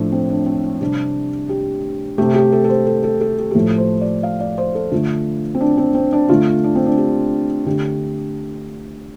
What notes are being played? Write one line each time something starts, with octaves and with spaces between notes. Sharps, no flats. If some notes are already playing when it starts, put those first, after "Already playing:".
Already playing: A2 F3 A3 D4
C4
D4
C4
D4
C3 G3 D4
G4
C3 A3 G4
G4
A4
A4
C5
A4
A4
A4
G4
G4
A2 F3 A3 A4
C5
D5
F5
D5
C5
A4
D3 A3 F4
C4
D4
C4
C4
D4
D3 A3 F4
D4
C4
D4
G4
D3 A3 G4